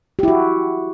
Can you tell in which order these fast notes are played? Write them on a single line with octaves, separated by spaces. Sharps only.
G4 E4 F#4